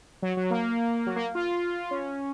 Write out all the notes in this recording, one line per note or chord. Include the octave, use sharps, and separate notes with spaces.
F#3
F#3
A#3
F#3
A#3
F4
C#4